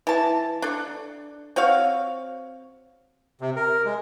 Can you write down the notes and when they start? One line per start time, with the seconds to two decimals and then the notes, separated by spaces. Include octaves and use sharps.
0.07 E3 A5
0.62 D4 A4
1.56 C4 F#4 C#5 F5
3.41 C3
3.56 A#4
3.85 G#3